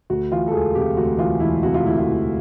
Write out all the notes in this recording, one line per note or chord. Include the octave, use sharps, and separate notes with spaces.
D2 F#4
E3 F4
A4
E1 G#4
C3 G4
D2 F#4
E3 F4
E1 E4
C3 F#4
F4
D2 E4
F4
E3